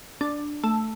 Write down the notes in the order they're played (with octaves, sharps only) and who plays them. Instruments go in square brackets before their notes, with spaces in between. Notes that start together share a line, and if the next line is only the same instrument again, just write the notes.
[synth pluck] D4
A3